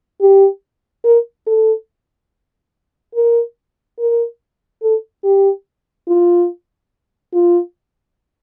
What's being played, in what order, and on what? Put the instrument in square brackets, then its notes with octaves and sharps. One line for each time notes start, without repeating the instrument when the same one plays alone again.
[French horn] G4
A#4
A4
A#4
A#4
A4
G4
F4
F4